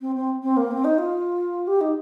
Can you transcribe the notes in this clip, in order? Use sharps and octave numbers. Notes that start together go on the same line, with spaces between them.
C4
C4
C4
A#3
C4
D#4
F4
G4
D#4